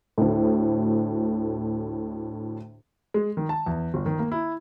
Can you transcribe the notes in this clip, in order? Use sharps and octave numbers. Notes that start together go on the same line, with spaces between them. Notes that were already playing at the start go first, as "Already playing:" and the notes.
D2 A2
G#3
D#3
A5
E2
G1
D#3
A#3
E4